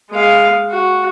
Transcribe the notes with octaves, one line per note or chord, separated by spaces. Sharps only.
G#3 F5
F#4